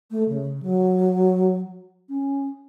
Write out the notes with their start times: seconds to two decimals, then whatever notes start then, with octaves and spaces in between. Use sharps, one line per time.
0.11 A3
0.28 C#3
0.63 F#3
2.09 C#4